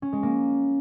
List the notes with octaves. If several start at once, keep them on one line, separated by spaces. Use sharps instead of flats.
C#4
G#3
A#3